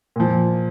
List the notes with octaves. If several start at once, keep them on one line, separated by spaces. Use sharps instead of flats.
A#2 F3